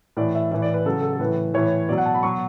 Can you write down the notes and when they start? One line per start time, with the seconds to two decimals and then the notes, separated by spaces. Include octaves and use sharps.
0.17 A2 E3 D5
0.35 E5
0.51 A2 E3 E5
0.62 D5
0.74 B4
0.86 C#3 F#3 A4
1.02 A4
1.13 A4
1.19 A2 E3 B4
1.54 A2 E3 C#5
1.89 B2 F#3 D5
1.98 F#5
2.05 A5
2.15 B5
2.23 B2 F#3 C#6